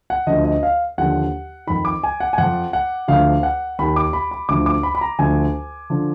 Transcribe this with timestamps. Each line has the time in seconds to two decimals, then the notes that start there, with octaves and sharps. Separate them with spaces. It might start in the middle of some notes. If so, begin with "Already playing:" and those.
0.10 F#5
0.27 D2 D3 F3 D#5
0.45 D#5
0.63 F5
0.98 D#2 D3 F3 F#5
1.67 F2 D#3 B5
1.85 D6
2.03 G#5
2.20 F#5
2.33 G#5
2.38 F2 F3 F#5
2.73 F#5
3.08 D2 D3 F3 F5
3.43 F#5
3.79 D#2 D#3 B5
3.96 D6
4.13 B5
4.31 B5
4.49 D2 D3 F3 D6
4.66 D6
4.83 B5
4.95 B5
5.01 A#5
5.19 D2 D3 F3 G#5
5.90 D3 F3